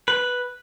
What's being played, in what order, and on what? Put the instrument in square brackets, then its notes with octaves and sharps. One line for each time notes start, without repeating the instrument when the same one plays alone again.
[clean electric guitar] B4